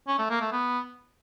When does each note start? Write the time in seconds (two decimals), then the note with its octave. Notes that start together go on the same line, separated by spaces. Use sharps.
0.08 C#4
0.19 A3
0.30 A#3
0.41 A3
0.52 B3